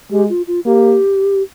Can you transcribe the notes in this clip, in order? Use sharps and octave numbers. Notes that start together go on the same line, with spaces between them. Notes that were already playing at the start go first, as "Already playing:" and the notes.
G#3 G4
F4
F4
A#3 G4